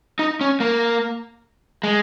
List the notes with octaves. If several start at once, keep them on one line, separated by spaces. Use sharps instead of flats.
D#4
C#4
A#3
G#3